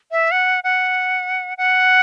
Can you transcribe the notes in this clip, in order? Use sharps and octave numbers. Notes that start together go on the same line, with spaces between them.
E5
F#5
F#5
F#5